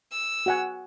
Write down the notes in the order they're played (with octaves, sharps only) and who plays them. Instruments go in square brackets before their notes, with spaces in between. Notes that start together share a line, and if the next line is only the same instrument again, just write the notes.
[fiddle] E6
[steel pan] F#4 F#5 G#5